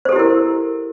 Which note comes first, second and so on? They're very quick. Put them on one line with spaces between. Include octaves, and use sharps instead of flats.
C5 A4 G4 E4 A#4